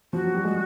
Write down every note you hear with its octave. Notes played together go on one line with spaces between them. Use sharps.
F3 F#4
F#3
G3
G#3